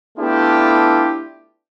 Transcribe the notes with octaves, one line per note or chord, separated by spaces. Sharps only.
A3 B3 D4 E4 F4 G4